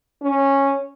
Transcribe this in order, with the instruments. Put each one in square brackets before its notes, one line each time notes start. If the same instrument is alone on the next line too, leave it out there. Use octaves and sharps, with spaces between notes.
[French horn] C#4